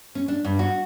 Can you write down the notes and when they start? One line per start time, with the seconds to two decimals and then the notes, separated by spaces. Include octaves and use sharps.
0.15 C#4
0.28 D4
0.44 G2
0.59 F#4